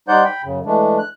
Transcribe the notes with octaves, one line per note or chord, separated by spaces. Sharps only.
G3 D#4 C5 D5 F#5 G6
G5 B5
F#2 C#3
E3 G#3 A3 D4
F#6